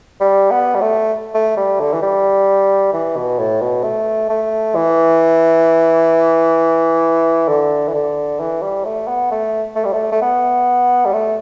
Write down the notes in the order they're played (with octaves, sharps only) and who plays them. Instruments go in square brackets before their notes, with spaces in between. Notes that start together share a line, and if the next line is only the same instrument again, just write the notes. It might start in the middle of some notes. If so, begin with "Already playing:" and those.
[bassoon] G3
B3
G3
A3
A3
G3
D3
E3
G3
E3
B2
A2
B2
A3
A3
E3
D3
E3
D3
E3
G3
A3
B3
A3
A3
G3
A3
A3
B3
G3
A3